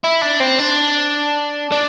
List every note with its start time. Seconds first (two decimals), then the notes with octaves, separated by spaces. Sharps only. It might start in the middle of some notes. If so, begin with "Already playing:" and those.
0.04 E4
0.22 D4
0.40 C4
0.60 D4
1.72 D4